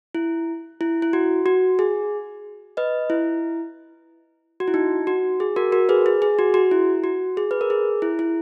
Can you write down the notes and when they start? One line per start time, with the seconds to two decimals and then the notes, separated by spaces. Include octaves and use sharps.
0.15 E4
0.81 E4
1.02 E4
1.13 F#4
1.46 F#4
1.79 G#4
2.77 B4 D#5
3.10 E4
4.60 F#4
4.68 E4
4.74 D#4
5.07 F#4
5.40 G#4
5.56 F#4 A#4
5.72 F#4 A#4
5.89 G#4 B4
6.06 G#4
6.22 G#4
6.39 F#4
6.54 F#4
6.71 E4
7.04 F#4
7.37 G#4
7.51 B4
7.61 A#4
7.70 G#4
8.02 E4
8.19 E4